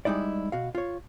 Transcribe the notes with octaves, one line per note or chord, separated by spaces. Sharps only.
G3 G#3 D#4 E4 D5
B2 F#4 F5
F4 C#5